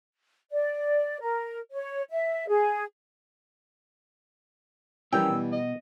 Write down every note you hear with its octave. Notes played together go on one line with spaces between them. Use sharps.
D5
A#4
C#5
E5
G#4
E3 G3 C#4 A#4 G5 E6
B2
D#5